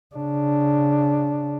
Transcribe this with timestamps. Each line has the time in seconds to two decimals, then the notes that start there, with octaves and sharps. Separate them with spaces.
0.15 C#3 D4